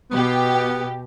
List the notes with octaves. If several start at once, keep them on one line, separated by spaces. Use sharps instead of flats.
B2 B3 G4